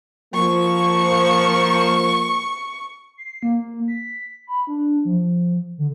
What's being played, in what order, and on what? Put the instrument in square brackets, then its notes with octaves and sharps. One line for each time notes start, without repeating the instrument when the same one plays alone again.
[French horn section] F3 A#3 [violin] C#6
[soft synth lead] C7
A#3
B6
B5
D4
F3
D3